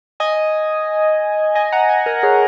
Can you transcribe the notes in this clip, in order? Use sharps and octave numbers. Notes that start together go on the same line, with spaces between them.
D#5 G#5
D#5 G#5
F#5 A#5
D#5 G#5
A#4 D#5
G#4 C#5